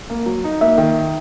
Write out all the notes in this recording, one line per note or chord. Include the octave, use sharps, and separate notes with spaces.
A#3
F#3
D#4
A#3 E5
D#3